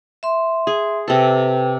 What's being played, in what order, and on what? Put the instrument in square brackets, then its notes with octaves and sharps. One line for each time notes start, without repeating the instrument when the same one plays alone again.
[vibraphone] E5 C6
[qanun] G#4
[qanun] C3 A4 [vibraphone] B4 G5